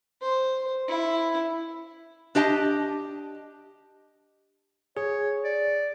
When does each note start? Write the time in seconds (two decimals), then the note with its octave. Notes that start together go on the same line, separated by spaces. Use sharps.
0.22 C5
0.88 E4
2.35 D4 G4 D#5 A5
4.97 G#4 C#5
5.44 D5